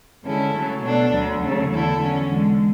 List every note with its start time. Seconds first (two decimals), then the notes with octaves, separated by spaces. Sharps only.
0.24 D3 G#3 C#4 E4 A4
0.53 C#3 F#3 A3
0.82 B2 A3 D4 A4
1.11 D2 D3 F#3
1.41 C#3 F#3 A3
1.70 E2 D3 A3 E4 A4
2.00 D3 F#3 C#4
2.29 E2 D3 G#3